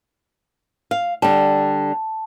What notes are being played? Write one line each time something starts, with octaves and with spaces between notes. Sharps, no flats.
F5
D3 G3 A5